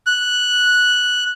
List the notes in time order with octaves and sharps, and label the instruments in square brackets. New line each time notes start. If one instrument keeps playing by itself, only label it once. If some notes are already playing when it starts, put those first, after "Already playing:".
[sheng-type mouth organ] F#6